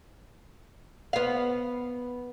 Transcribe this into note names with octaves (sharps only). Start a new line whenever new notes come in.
B3 F5